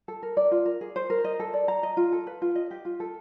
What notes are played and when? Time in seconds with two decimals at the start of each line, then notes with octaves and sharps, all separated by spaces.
0.08 A4
0.23 A#4
0.37 D5
0.51 F4
0.65 A#4
0.81 G#4
0.96 C5
1.10 A#4
1.24 D#5
1.40 A4
1.54 D5
1.68 A#5
1.83 D#5
1.97 F4
2.12 A4
2.27 B4
2.42 F4
2.55 D#5
2.71 G4
2.85 F4
3.00 A4